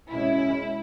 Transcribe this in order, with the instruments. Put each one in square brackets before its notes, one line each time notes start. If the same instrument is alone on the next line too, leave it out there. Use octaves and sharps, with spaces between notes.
[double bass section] B2 G#3 C#4 [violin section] E4